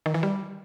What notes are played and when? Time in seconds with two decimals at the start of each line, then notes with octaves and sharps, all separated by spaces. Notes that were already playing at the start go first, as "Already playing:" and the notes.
0.06 D#3
0.14 E3
0.23 G3